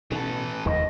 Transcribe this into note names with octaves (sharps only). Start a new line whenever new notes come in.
B2 E3 A4
F1 D#2 G3 D#5